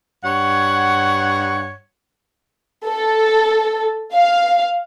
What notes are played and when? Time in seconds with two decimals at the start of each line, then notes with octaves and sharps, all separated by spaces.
0.24 G2 C#5 F#5
2.86 A4
4.13 F5